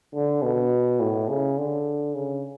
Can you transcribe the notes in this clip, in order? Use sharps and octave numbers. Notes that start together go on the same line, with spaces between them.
D3
B2
A2
C#3
D3
C#3